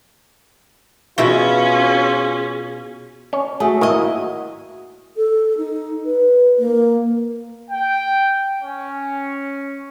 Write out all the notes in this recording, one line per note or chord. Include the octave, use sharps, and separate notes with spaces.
B2 C#4 E4 F4 G#4 E5
C#4 C#5
A3 F#4 G#4
D#3 A#3 E4 D#5
A4
D#4
B4
A#3
G5
C#4